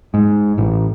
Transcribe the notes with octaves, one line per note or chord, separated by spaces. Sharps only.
G#2
A1